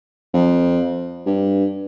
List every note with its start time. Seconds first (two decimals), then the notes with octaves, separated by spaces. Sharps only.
0.33 F2
1.26 G2